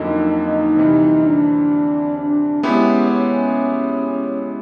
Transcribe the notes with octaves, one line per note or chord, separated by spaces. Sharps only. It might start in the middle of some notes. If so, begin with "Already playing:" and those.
Already playing: F2 D3 F#3 A#3 D#4
D#4
C3 E3 G3
D4
D4
G#3 B3 C#4 E4 G4
C#4